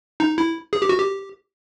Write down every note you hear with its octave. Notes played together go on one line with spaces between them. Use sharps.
D#4
E4
G#4
G4
F#4
G4